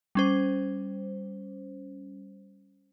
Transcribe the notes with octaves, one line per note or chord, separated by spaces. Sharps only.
G3 C#4 C5